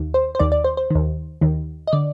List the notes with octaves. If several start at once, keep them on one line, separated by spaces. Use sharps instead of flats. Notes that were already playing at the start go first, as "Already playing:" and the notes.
Already playing: D#2 D#3
C5
C5
D#2 D#3 D5
D5
C5
C5
D#2 D#3
D#2 D#3
D#5
D3 D5